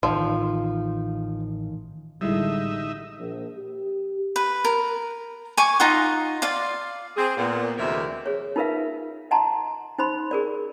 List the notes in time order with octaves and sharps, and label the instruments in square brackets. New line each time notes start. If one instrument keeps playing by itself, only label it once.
[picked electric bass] A1 D#3 [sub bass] A2 [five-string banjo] F3
[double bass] A1 D3 [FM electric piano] G3 G#3 E4 [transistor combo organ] D#4 E5
[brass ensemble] A#1
G4
[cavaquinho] B4
A#4
G#5 C#6 D6
D#4 F4 F#5
F4 D5 F5
[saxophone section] C4 G#4
A#2 B3
D2 C3 E3 G#3 A#4 E5
[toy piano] G#4 C#5
D#4 F4 A#4 B4 E5 F5
D#5 F#5 A5 A#5 C6
D#4 C5 B5 C6
G#4 A#4 D5